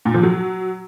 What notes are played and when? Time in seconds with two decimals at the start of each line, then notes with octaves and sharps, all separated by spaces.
0.05 A#2
0.14 F3
0.23 F#3